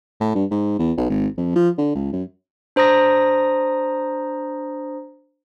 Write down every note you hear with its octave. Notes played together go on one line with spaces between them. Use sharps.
A2
G2
G#2
E2
B1
G#1
F2
F3
D3
C#2
F#2
D4 C5 A#5 D#6 A#6